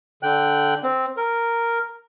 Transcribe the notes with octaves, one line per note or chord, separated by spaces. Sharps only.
D3 G5 F#6
C4
A#4